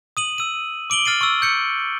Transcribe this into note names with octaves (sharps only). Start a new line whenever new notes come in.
D#6 D#7 F#7
E6 D#7
D6 D7 F#7 G7
F6 A6 C7 D#7
C#6 E6
G6 C#7